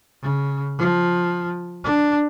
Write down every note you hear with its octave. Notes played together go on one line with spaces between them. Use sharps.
C#3
F3
D4